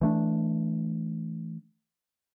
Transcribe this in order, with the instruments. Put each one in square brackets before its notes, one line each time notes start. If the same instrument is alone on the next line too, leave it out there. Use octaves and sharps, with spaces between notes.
[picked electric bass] E3 A3 D4